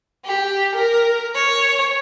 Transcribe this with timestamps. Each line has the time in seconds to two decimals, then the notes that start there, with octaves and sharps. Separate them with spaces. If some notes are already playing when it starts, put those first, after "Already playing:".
0.25 G4
0.75 A#4
1.35 C#5